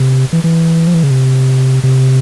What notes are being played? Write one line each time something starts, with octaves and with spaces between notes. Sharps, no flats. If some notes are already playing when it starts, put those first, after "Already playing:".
Already playing: C3
E3
E3
F3
E3
C#3
C3
C3